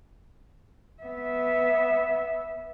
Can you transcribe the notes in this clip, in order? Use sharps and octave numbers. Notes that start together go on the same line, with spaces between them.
B3 E5